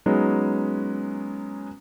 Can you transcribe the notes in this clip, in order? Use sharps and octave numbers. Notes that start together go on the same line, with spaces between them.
F#3 G#3 B3 C#4 D#4